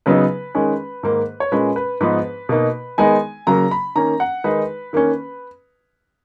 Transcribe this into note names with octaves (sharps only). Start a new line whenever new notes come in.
C#3 F#3 B3 D#4 B4
D#3 G#3 C#4
G#2 D#3 A#3
C#5
A#2 G#3 C#4 B4
B4
G#2 F3 B3 D#4 B4
B2 A#3 D#4
D#3 G#3 B3 D#4 G#5
C#3 F#3 A#3 A#5
B5
D#3 A#3 C#4 A#5
F#5
D#3 G#3 D#4 B4
D#3 A#3 C#4